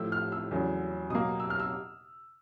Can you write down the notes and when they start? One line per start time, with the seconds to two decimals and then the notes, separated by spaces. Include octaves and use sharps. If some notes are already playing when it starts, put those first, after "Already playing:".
Already playing: A2 F3 A3 E6
0.12 F6
0.32 E6
0.51 E2 C#3 F#3 A3
1.10 B2 F#3 A#3 D#6
1.40 E6
1.50 F6
1.60 E6